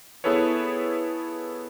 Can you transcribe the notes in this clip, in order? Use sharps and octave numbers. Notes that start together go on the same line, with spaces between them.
B3 E4 G#4 A4 B4 C#5